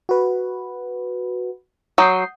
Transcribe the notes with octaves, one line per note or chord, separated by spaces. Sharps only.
F#4 B4
F#3 D#6 G6 C7